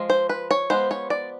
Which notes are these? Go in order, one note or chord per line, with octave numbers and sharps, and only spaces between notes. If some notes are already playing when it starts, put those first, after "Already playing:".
Already playing: F3 G#3
C5
B4
C#5
F3 G#3 B3 C5
C#5
D5